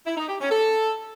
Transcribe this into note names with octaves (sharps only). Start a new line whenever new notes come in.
E4
D#4
G4
C#4
A4